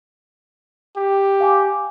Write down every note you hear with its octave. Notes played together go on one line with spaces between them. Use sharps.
G4
F5 G#5 D6